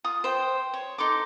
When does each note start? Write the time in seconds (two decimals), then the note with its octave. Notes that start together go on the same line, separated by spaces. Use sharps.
0.04 F4 D#6
0.24 C5 G5
0.74 C#5
0.98 D#4 A4 C6 D6